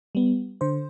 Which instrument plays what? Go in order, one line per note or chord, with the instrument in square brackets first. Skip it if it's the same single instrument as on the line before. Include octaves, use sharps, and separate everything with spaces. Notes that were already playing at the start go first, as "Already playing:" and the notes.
[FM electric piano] G3 B3
D3 C5